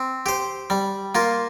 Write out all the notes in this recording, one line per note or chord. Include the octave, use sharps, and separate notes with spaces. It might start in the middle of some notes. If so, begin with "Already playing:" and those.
Already playing: C4
G4 C5
G3
A#3 F4